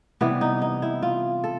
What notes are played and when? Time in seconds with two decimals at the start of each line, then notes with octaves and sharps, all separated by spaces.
0.21 C3 E3 G3 B3
0.41 D#4
0.62 D#4
0.82 E4
1.03 F4
1.44 A4